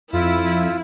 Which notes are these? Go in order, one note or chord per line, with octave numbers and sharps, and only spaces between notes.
F2 E4 F4